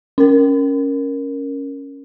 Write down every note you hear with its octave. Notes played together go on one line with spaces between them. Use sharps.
C#4 A#4